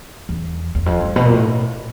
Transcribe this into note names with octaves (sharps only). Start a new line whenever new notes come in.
E2
E2
F2
G2
B2
A#2
A2